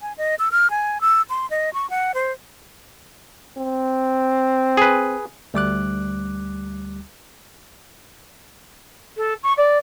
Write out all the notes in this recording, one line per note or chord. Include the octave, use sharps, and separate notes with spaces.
G#5
D#5
E6
F6
G#5
E6
C6
D#5
C#6
F#5
C5
C4
G#4 B4
D2 G3 D6 F#6
A4
C#6
D5